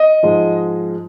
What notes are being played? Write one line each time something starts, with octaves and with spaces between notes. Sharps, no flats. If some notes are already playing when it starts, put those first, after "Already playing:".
Already playing: D#5
G#2 F3 G#3